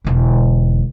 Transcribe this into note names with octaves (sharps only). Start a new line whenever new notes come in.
E1 D3